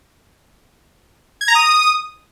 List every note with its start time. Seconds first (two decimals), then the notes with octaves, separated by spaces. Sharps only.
1.41 G#6
1.48 A#5
1.55 D#6